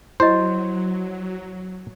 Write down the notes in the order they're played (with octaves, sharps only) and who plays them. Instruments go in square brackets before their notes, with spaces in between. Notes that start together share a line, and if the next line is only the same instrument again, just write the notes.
[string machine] F#3 [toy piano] E4 G4 D#5 [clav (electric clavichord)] C5